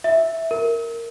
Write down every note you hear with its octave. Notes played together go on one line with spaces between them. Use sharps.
E5
A#4